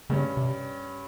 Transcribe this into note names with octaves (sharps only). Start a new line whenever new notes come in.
G2 C#3 G3 C#4
C3